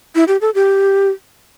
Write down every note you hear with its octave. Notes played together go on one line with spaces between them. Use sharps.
E4
G4
A4
G4